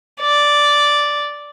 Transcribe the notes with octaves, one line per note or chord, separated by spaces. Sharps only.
D5